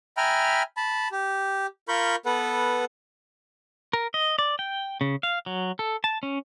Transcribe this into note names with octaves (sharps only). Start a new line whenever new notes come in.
E5 G5 G#5 A#5 B5 F6
A5 B5
G4
F4 A#4 B5 C#6 G6
B3 A4 B4 F#5
A#4
D#5
D5
G5
C#3
F5
F#3
A4
A5
C#4